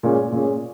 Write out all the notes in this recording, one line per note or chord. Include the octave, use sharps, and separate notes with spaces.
A#2 G#3 C#4 G#4
A#2 G#3 C#4 G#4